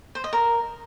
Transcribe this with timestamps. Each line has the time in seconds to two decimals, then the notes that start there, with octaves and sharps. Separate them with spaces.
0.15 C5
0.24 D#5
0.33 A#4